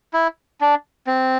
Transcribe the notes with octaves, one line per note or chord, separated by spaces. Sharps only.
E4
D4
C4